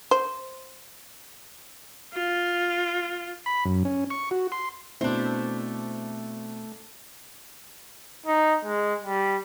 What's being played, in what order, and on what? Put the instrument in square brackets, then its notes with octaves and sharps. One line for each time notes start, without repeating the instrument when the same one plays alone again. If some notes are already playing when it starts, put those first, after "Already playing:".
[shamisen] C5
[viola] F4
[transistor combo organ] B5
F#2
C#4
C#6
F#4
C6
[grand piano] B2 C4 E4 [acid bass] A3 [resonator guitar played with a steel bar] D4 C5
[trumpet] D#4
G#3
G3